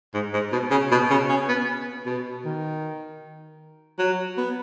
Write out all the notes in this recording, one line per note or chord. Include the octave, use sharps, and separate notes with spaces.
G#2
G#2
B2
C#3
B2
C#3
C#4
B3
B2
D#3
F#3
B3